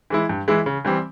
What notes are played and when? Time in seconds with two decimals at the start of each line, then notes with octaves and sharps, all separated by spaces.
0.10 E3 G#3 E4
0.29 G2
0.48 E3 G#3 E4
0.66 C#3
0.85 E3 G3 C4